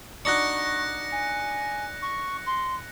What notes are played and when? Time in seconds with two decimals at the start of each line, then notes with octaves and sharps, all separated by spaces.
0.25 D4 D#4 F#4 C#6 F#6 A#6 C#7
1.12 G#5
2.02 C#6
2.46 C6